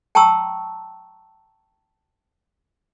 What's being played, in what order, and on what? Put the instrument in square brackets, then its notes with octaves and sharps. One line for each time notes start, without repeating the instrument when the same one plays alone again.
[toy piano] G5 A5 A#5 C#6 E6